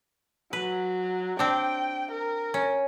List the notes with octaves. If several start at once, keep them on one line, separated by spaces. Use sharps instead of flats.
F#3 B4
C4 D4 G5
A#4
C#4